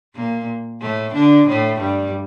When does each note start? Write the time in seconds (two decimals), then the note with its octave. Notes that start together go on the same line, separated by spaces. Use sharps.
0.15 A#2 A#3
0.81 A2 A3
1.14 D3 D4
1.48 A2 A3
1.80 G2 G3